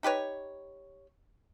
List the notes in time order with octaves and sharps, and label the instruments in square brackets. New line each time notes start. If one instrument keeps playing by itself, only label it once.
[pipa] D#4 G4 B4 C#5